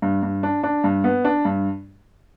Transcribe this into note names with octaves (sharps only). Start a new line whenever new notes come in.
G2
G2
D4
D4
G2
B3
D4
G2